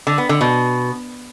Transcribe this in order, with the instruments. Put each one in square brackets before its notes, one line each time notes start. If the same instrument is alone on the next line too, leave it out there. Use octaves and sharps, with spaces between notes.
[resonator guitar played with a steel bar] D3
B3
D3
B2